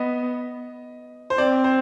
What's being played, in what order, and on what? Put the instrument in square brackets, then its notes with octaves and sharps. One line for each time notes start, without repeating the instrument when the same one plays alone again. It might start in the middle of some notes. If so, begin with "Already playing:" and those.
Already playing: [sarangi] B3 [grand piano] D#5
[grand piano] C5
[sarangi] C4 [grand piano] D5
[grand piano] C5